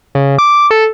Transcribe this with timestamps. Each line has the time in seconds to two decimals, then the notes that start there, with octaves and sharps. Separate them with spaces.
0.15 C#3
0.38 D6
0.71 A4